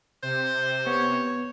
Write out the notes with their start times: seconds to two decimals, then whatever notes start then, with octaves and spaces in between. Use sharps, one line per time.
0.23 C3 C5
0.87 B3 C#5